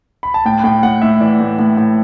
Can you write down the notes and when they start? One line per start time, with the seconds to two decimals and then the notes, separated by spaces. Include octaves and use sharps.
0.23 B5
0.34 A5
0.45 A2 G5
0.64 A2 G5
0.83 A2 F#5
1.02 A2 E5
1.20 E3 D5
1.40 A2
1.59 A2
1.77 A2